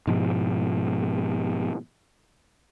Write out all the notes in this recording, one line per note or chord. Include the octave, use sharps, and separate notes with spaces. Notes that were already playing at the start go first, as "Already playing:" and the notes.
G#2 B2 F3